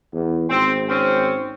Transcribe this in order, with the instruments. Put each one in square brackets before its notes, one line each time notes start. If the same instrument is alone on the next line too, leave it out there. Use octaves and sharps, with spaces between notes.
[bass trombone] E2
[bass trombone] G#1 [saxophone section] C4
[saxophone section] C4 C#4